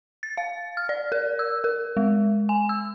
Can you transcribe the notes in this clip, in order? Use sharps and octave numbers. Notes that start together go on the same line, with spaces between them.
A6
F5
F6
D5
A#4
E6
A#4
G#3
G#5
E6